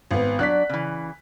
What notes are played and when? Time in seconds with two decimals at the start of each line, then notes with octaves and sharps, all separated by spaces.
0.11 G#1 B3
0.39 F#3 D4 D5 F#6 B6
0.69 C#3 E3